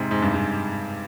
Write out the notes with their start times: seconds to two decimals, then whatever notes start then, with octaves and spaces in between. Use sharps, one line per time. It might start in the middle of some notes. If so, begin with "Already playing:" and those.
Already playing: G#2 C3
0.11 G#2
0.22 G2
0.34 G#2